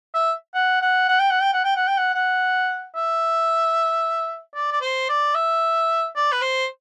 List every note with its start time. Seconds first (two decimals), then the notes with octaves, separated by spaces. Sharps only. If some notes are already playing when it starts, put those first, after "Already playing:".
0.14 E5
0.54 F#5
0.82 F#5
1.08 F#5
1.20 G5
1.31 F#5
1.42 G5
1.53 F#5
1.64 G5
1.76 F#5
1.87 G5
1.98 F#5
2.14 F#5
2.95 E5
4.55 D5
4.71 D5
4.81 C5
5.09 D5
5.35 E5
6.16 D5
6.32 B4
6.42 C5